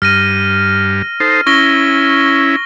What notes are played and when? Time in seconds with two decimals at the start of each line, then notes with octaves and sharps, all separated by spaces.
0.02 G2 F6 A#6 D#7
1.20 D#4 A4 C5
1.46 C#4 E4 C#6 A#6 G7